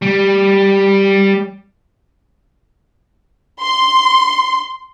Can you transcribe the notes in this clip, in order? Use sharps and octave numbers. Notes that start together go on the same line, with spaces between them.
G3
C6